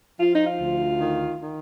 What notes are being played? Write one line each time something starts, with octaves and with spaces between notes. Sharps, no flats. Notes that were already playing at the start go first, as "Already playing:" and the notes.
F3 F4
D#4
F4
D2
D#3
D#3